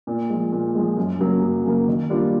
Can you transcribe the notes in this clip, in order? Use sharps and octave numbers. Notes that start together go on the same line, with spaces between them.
A#2
F3 G#3
A#2
F3 G#3
F#2
C#3 F#3 A#3
F#2
C#3 F#3 A#3
D#3
G3 A#3 D4 F4